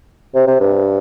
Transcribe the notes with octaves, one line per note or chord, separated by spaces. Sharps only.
C3
C3
G2